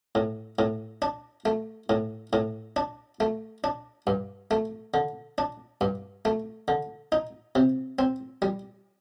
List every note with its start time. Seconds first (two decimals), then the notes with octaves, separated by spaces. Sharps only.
0.15 A2
0.59 A2
1.02 D4
1.45 A3
1.90 A2
2.33 A2
2.76 D4
3.20 A3
3.64 D4
4.07 G2
4.51 A3
4.94 D3
5.38 D4
5.81 G2
6.25 A3
6.68 D3
7.12 D#4
7.55 C3
7.99 C4
8.42 G3